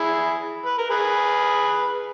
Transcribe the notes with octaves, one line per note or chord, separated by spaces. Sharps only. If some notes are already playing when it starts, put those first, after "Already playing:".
Already playing: E4 G#4
B4
A#4
G#4 B4